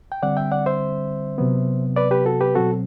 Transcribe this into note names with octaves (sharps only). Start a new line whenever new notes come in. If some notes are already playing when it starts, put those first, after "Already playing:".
G5
D3 G3 C4 D5 F#5
E5 G5
D5 F#5
C5 E5
C3 F#3 B3
B4 D5
G4 B4
F#4 A4
G4 B4
B2 F#3 C4 F#4 A4